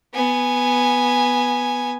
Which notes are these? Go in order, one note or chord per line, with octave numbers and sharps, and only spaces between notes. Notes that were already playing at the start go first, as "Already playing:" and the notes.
B3 G#5